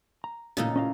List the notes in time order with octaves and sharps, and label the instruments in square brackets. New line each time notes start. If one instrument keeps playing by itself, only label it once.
[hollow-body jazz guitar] A#5
[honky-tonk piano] A1 A#2 [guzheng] C#3 D#4 A4
[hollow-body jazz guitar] C#4 D#5 F5